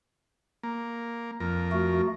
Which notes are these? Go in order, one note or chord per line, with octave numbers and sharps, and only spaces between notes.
A#3
F2 A#4
A3 F#4